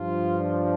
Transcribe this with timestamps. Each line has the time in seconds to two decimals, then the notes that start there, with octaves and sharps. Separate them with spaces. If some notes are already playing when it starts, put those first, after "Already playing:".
Already playing: G2 F3 F4
0.39 D4